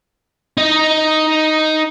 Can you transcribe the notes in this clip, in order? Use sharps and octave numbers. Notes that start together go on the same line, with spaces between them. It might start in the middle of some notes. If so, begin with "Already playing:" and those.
D#4 D#5